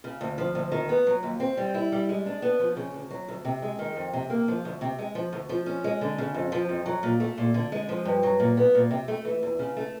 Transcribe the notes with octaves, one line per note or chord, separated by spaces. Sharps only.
C#3
D2
F3
D2
D#3
B3
F#3
D#2
C4
G3
E4
G3
G#3
D4
B3
F3
C#3
D2
F#3
D2
C3
G#3
D#3
F2
C3
A#3
F3
D2
C3
G#3
F3
D2
F3
C#4
G#3
D3
C#3
F2
F3
F2
F#3
A#2
A3
A#2
D3
G#3
F3
G2
F#3
A#2
B3
A#2
C3
A3
E3
E2
C#3
A3